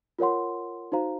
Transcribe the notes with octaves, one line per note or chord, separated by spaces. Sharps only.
F4 A#4 C#5 F#5 C6
D#4 F#4 C5 F5 A#5